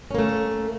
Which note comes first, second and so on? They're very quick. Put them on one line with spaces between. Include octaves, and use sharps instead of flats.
C#4 A#3 A3